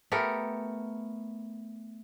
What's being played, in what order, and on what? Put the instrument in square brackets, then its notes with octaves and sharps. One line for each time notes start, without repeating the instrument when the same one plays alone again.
[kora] A3 B3 G4 A#4